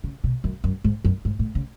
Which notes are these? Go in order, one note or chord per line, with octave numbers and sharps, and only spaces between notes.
C#3
B2
F#2
F#2
G#2
F#2
G#2
A2
C#3